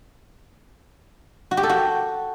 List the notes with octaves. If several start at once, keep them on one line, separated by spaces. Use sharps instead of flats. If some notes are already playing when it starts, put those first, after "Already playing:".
F#4
G4
A4
F#4